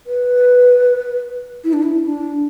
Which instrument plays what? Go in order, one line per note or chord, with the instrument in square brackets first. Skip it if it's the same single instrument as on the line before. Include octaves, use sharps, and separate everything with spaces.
[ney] B4
E4
D4
E4
D4